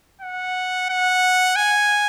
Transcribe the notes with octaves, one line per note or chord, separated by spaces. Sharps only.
F#5
F#5
G#5